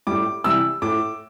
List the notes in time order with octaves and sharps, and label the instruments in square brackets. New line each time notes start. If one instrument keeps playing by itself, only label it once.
[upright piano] A2 G3 D6
C3 E3 G3 E6
A2 D6